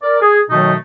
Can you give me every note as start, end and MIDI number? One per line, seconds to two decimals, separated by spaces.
0.03 0.21 70
0.03 0.21 74
0.22 0.40 68
0.50 0.73 47
0.50 0.73 51
0.50 0.73 54
0.50 0.73 57
0.50 0.73 63
0.50 0.73 87